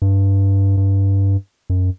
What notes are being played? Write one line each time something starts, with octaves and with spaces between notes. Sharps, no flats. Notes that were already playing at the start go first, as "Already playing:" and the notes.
G2
G2
F#2